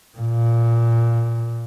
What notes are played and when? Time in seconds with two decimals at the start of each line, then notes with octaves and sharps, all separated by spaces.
0.18 A#2